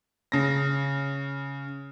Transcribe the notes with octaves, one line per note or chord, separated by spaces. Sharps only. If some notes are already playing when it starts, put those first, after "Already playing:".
C#3 A#6